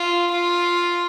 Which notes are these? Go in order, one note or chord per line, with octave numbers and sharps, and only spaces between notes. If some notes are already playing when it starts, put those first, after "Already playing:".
Already playing: F4
F4